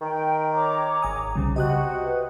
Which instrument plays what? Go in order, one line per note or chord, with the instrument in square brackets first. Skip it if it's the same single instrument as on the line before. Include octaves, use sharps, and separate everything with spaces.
[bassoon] D#3 [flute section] G5
[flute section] C#5 A#5 D6
[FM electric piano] G#1 G#5 D#6
C2 C#3 G3
[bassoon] C3 [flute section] F#4 [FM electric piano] D#5 D#6 F#6
[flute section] B4